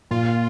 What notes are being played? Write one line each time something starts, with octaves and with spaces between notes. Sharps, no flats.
A#2 F4